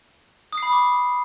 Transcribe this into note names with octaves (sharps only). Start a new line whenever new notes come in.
D#6
C7
B5
D#6
D6